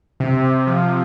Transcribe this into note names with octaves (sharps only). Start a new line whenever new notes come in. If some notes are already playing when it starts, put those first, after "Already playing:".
C3
C3
F3